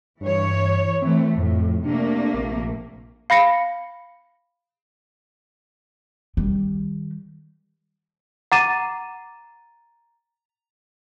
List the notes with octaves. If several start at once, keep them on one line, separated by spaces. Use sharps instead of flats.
G2 E3 C#5
E3 A3 C4
F2 A2
C3 A3 A#3 D4
A#1
F5 B5 A#6 C#7
D#3 G3
F#5 A#5 D6 A6 D#7 E7